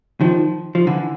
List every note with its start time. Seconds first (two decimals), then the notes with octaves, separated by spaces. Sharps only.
0.21 D#3 F3
0.75 F3
0.87 D3 E3